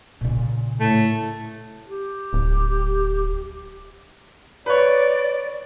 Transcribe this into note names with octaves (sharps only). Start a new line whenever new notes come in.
A#2 C#3
A2 A3
G4
D1
B4 C#5 D5